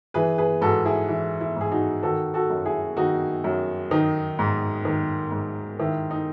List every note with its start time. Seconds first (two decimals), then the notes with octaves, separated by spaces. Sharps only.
0.14 E3 G#4 B4
0.38 G#4 B4
0.61 G#2 F#4 A4
0.85 E4 G#4
1.08 E3 E4
1.40 E4
1.56 G#2 G#4
1.72 D#4 F#4
2.03 D#3 F#4 A4
2.34 F#4 A4
2.50 F#2
2.65 E4 G#4
2.97 D#3 D#4 F#4
3.44 F#2
3.91 D#3 D#4
4.39 G#2
4.85 D#3
5.32 G#2
5.79 D#3 E4
6.11 D#4